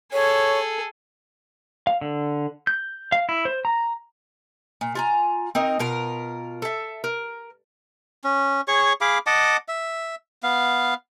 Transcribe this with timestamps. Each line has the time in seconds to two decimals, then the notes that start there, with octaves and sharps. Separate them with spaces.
0.13 G#4 A4 C#5
1.87 F5
2.01 D3
2.67 G6
3.12 F5
3.29 E4
3.45 C5
3.65 A#5
4.81 A#2
4.95 F4 G#5 A#5
5.55 C4 D#4 A#4
5.79 B2 F4 A#4 A#5
6.62 A4 E5
7.04 A#4
8.24 C#4
8.68 G#4 C#5 C#6
9.01 G#4 F5 B5 D6
9.27 D#5 F#5 A5 D6
9.68 E5
10.43 B3 F5